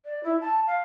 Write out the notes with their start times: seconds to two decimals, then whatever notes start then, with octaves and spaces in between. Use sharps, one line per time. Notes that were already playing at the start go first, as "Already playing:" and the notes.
0.05 D5
0.23 E4
0.41 A5
0.66 F5